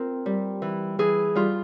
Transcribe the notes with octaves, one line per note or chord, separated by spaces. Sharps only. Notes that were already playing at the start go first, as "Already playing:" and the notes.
Already playing: C4 F4 A#4
G3
E3
E3 G#4
G3 F4